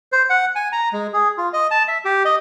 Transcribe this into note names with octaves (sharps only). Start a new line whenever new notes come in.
C5
F#5
G#5
A#5
G#3
G#4
F4
D#5
A5
E5
G4
D#5